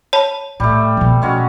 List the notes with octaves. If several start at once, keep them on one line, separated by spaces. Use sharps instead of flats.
C#5 A5 B5
A2 G3 A3
B2 F3
G#3 C#4 F#4